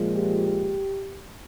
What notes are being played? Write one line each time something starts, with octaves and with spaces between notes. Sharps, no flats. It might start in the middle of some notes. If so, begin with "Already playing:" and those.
Already playing: A#2 F3 G#3
G4